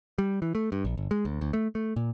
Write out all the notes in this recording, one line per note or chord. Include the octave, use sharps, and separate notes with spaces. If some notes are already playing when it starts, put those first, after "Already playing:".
G3
E3
A3
G2
A#1
G1
G#3
D2
D2
A3
A3
A#2